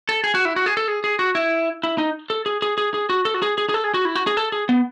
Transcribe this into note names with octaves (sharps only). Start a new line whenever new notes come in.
A4
G#4
F#4
E4
F#4
G#4
A4
G#4
G#4
F#4
E4
E4
D#4
A4
G#4
G#4
G#4
G#4
F#4
A4
F#4
G#4
G#4
G#4
A4
G#4
F#4
E4
F#4
G#4
A4
G#4
B3